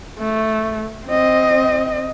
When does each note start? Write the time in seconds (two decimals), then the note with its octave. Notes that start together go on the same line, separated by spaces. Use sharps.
0.19 A3
1.06 C4 D#5